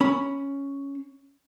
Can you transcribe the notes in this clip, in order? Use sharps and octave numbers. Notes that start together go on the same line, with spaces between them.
C#4 B5